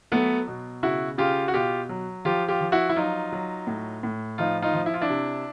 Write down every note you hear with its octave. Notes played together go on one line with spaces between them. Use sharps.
F#3 A3 B3
B2
C#3 E4 F#4
C#3 F4 G4
F#4
B2 F4 G4
F#3
F3 F4 G4
F4 G4
F3
E4 F#4
E4
F#3 D#4 F4
F#3
A2
A2
F3 D#4 F4
D#4 F4
F3
E4
F4
D4 E4
C3